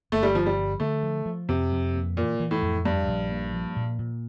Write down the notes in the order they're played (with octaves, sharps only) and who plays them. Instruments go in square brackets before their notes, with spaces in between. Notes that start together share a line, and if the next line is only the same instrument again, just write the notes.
[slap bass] G1 [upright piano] A3
[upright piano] G3
[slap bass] G1 [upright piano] F3
[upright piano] G3
[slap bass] F3
[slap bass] D3 [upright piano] A3
[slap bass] F3
F3
[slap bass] F2 [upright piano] C3
[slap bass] F2
A#3
[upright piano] A#2 [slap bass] E3
[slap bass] E3
[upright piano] A2
[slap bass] F2
[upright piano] G2 [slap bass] F3
[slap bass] A#1
A#3
F3
A#2
A#2